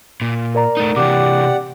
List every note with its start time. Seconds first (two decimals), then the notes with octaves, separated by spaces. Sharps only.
0.21 A#2
0.55 A#4 D5 A#5
0.77 A3 D#4
0.96 C3 E3 G4 D5 F#5 D6